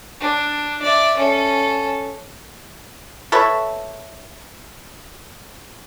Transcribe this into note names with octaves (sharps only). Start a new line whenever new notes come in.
D4
D5 E5
C#4 A4
A4 B4 C#5 E5